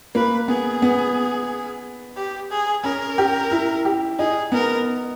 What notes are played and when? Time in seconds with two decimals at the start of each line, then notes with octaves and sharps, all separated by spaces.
0.15 A#3 B4
0.48 B3 G#4
0.82 B3
2.16 G4
2.51 G#4
2.84 C#4 A#4
3.18 G4
3.51 E4
3.85 G4
4.19 D#4 G#4
4.52 B3 A#4